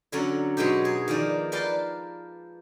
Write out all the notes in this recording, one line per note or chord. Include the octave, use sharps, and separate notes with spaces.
D3 F#3 C#4 D5 A#5
B2 F#3 G#3 D#4 G4
G#4
D#3 F3 A#3 D5
A#4 B4 D5 F5 G5 A5